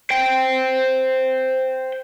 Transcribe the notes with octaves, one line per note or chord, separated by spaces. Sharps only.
C5 G5